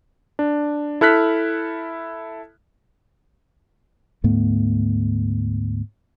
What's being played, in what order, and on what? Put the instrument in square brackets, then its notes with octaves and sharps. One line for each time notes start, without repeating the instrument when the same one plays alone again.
[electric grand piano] D4
E4 A4 F6 F#6 B6
[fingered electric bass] D2 G#2 A3 B3